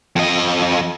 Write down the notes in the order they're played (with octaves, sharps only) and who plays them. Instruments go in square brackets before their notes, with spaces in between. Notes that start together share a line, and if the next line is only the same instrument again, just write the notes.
[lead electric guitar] F2 D#5